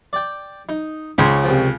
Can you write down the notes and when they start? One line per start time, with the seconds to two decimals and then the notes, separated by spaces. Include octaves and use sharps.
0.13 D5 G5
0.69 D#4
1.18 C#2 C#3 C5 C#5
1.44 C2 F3